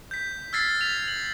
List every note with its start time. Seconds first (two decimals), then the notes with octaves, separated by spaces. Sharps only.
0.11 G6 B6
0.53 E6 F6 G#6 A6 B6 C7
0.81 B6 F7
1.08 F#7